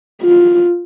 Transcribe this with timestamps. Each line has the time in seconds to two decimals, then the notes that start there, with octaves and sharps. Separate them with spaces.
0.22 F4